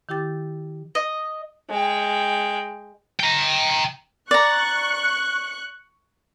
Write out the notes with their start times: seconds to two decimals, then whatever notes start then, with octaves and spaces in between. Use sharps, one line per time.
0.09 D#3 E4 G4 G5 D6 A6
0.95 D#5
1.70 G#3 G5
3.20 G5 A#5
4.31 D5 A#5 C#6 F#6